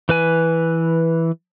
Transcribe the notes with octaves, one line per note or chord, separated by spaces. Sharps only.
E3 B4 G#5